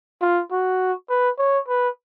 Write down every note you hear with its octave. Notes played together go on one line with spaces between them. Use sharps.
F4
F#4
B4
C#5
B4